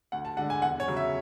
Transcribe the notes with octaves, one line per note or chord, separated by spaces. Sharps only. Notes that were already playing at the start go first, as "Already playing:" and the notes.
D2 F#5
A5
D3 G#3 D4 F#5
G#5
E2 F#5
C#5
C#3 F#3
E5